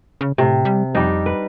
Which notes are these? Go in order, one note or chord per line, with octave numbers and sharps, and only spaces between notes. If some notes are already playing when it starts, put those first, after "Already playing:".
C#3
A2 C3
G3
F2 G3 D4 D#4
B4